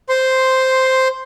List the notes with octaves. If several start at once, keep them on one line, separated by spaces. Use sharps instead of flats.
C5 C6